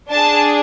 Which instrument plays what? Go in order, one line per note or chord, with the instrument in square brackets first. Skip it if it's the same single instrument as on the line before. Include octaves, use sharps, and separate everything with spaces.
[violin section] D4 G#4 A5